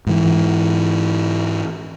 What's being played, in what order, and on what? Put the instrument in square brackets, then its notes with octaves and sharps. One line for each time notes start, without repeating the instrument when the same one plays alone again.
[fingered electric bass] G#2 E3